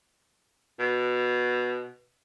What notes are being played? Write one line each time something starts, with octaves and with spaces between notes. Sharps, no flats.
B2